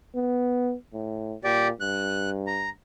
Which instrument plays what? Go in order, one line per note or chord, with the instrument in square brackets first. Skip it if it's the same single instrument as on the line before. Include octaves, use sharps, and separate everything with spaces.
[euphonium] B3
A2
[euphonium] A#2 [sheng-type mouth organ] G4 D5
[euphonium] G2 [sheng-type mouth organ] F#6
[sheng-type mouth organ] A#5